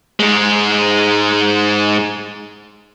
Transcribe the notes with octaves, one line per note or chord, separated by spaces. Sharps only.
G#2 G#3